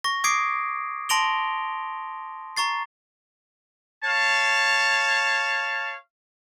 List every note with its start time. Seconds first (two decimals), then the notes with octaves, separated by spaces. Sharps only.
0.04 C#6 A#6
0.24 D6 D#6 G#6 C7 D7
1.09 A5 C6 A#6 D7 F7 G7
2.57 A#5 C#6 A6 C7
4.04 C#5 F5 A5